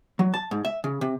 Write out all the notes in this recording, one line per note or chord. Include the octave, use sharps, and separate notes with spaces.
F#3
A5
G#2
E5
C#3
C3